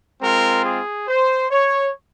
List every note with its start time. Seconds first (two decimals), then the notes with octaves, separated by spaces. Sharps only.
0.21 G#3 C4 F4 A#4
0.64 G#4
1.08 C5
1.51 C#5